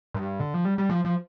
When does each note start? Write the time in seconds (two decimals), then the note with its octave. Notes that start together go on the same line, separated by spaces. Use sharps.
0.14 G2
0.40 D3
0.54 F3
0.65 G3
0.78 G3
0.90 F3
1.05 F3